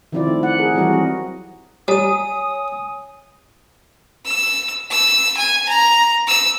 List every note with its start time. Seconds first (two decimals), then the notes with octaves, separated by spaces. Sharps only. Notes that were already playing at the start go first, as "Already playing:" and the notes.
0.12 D#3 F3 C4 E4 F4 D5
0.27 D#3 A3
0.43 F#5
0.58 G#4 A#4
0.74 E3 F#3 G3 C4 F#4 A#4
0.93 C4
1.88 G3 C#5 G#5 D#6 D#7
4.26 E6
4.91 E6
5.37 G#5
5.69 A#5
6.27 E6